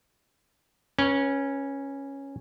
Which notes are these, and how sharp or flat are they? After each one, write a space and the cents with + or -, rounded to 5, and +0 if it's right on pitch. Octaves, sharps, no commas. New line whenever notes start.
C#4 -5 B4 -35